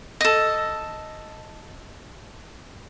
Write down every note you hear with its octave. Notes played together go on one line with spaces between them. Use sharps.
A4 D#5